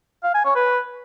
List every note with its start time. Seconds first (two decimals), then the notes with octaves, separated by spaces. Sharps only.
0.24 F5
0.34 G#5
0.45 C#5
0.55 B4